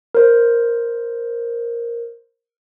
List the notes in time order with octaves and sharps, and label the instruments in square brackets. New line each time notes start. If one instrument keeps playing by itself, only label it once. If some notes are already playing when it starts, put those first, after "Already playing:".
[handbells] A#4 C5